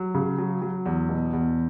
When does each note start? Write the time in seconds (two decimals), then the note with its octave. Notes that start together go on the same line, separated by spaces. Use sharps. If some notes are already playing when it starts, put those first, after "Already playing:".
Already playing: F#3
0.14 C#3
0.38 F#3
0.62 F#3
0.86 E2
1.09 B2
1.33 E2